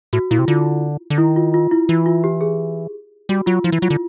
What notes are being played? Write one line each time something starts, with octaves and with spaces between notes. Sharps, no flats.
A2 F#4
A#2 E4
C3
D3 F4
D3
D#3 E4
F4
F4
E4
E3 E4
F4
G4
G#4
G3 F#4
F#3 F4
F3 E4
E3
F#3 F4
D3